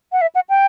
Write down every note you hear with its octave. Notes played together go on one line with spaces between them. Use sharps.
F#5
E5
F#5
G5